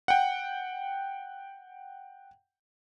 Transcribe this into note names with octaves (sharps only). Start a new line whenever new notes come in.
F#5 G5